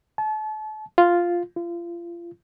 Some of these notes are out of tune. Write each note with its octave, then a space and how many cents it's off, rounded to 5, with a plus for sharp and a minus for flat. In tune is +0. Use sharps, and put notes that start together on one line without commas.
A5 -35
F4 +0
F4 -30